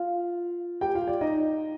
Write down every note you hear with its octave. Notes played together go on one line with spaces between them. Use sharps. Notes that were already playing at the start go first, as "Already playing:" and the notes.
Already playing: F4 F5
G4 G5
F4 F5
D5
D#4 D#5